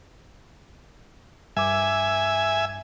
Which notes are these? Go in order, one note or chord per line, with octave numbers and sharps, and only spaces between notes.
G2 E5 G#5 D6